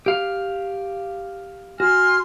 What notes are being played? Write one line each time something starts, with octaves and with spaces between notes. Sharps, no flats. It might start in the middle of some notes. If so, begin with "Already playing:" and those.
G4 F5
F#4 G#5 C6 F6